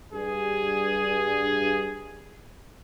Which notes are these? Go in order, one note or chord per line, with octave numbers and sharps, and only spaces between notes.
G2 G#4